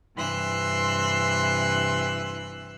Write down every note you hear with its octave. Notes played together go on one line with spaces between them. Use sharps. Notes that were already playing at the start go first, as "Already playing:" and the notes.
G2 C3 E3 C6 E6 F#6